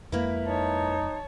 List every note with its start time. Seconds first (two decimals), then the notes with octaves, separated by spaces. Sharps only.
0.12 F2 G#3 A#3 E4 B4
0.46 D#4 C#5 A5